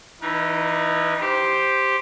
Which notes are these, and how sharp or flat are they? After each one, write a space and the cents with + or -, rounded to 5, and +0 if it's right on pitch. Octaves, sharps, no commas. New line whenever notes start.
E3 +0 D#4 -20 B4 -45
G4 +0 C5 +0